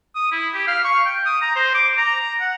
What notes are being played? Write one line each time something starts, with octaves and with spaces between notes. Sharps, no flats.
D#6
E4
G4
F5
C#6
G5
D#6
A#5
C5
D6
A#5
F#5